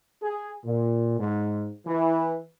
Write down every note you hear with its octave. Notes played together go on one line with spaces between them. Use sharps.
G#4
A#2
G#2
E3